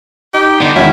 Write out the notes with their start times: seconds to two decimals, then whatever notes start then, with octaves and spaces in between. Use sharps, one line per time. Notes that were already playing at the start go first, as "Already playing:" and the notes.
0.34 D#4 G4
0.60 D3 B3 D4
0.76 E1 D#3 C#4 E4 F#4